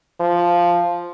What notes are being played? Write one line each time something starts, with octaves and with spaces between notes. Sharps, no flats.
F3